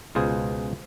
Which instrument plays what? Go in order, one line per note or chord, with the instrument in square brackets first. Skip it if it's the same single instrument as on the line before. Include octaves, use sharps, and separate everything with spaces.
[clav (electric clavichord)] C#2 B2 F4 G#4 C5